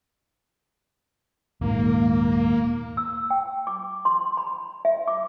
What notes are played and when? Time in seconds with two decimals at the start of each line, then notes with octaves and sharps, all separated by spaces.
1.61 D#1 G#2 A#3
2.97 E6
3.30 G5
3.67 D6
4.05 C6
4.37 B5
4.85 E5
5.08 D6